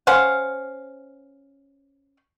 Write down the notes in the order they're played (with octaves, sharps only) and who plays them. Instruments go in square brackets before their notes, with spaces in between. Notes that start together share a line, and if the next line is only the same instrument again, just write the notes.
[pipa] C#4 C5 F5 F#5